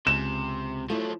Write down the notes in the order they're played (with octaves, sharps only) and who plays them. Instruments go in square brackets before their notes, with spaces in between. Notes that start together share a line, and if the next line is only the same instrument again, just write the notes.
[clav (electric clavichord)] C#2 [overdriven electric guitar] C3 [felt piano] E7
[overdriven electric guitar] F3 F#3 [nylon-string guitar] A3 E4